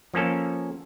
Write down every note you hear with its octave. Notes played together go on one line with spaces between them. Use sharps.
F3 A#3 C#4 A4